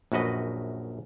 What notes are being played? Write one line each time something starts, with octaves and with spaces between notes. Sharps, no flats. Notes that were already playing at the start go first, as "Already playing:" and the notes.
A#1 F#2 F#4 B4 D#5